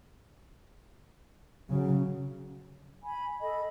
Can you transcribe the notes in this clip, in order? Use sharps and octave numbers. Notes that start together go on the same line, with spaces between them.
C#3 F#3
G#5 B5
A4 D#5 B5